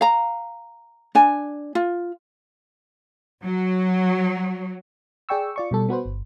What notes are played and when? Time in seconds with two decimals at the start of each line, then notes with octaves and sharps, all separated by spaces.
0.01 F5 A#5
1.15 D4 G#5
1.75 F4
3.44 F#3
5.29 G#4 D5 G5 C#6 E6
5.56 F4 D5 C#6
5.71 B2 G3 A4
5.89 B3 F#4 B4 C5
6.05 G1